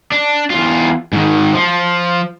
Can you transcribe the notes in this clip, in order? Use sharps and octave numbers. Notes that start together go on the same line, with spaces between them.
D4
E2 F4
G#2 D#3
F3